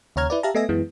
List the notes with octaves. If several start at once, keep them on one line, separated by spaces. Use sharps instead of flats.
D#2 C#3 C#5 A#5 F6 G#6
E4 B4 D5
G4 E5 F5 A5 A#5
A3 B3 D#5 E5 G#5 A#6
F#2 E3 G#3 B3